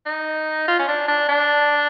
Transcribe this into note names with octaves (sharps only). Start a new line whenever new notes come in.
D#4
F4
C#4
D4
D4
D4